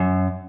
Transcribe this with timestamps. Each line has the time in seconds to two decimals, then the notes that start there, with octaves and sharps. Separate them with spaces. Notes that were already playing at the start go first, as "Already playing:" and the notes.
Already playing: F#2